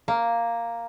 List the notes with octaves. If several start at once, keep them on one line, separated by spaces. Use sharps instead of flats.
A#3